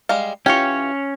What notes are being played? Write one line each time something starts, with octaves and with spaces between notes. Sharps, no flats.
G3 G#3 F5
E3 C#4 F4 G4 C#5